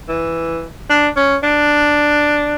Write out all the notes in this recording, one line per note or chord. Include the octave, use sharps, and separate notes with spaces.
E3
D4
C#4
D4